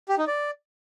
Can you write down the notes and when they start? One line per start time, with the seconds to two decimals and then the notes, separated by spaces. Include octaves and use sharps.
0.09 G4
0.18 D#4
0.27 D5